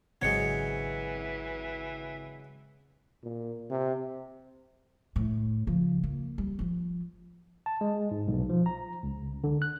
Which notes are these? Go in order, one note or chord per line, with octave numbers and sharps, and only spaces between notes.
G#1 C#3 E3 F#3 G#3 C4 G#6 C#7
A#2
C3
A2
C#3 F3
A#3
G3
F3 F4
A5
G#3
G#2
B1
F3
A#5
C#2
D3
F#6